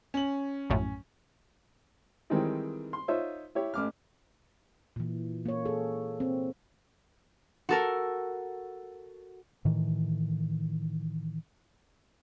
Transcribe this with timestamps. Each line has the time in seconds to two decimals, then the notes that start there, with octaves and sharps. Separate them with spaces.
0.14 C#4 F#7
0.70 A#1 F#2 A2
2.30 D#3 E3 G3 G#3 C4 D#4
2.93 C6
3.08 D#4 F4 C5 C#5 E5
3.55 E4 G4 C#5
3.74 A1 D6 F6
4.96 A#2 E3
5.46 A#3 C#5
5.65 G#4 A4
6.20 C4
7.69 F#4 A4 A#4
9.65 A2 D#3 E3